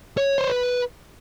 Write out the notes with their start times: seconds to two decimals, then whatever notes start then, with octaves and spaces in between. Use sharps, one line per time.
0.17 C#5
0.38 C5
0.49 B4